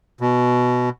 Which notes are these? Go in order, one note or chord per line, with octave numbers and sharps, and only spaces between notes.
B2